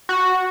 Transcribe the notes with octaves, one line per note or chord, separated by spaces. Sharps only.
F#4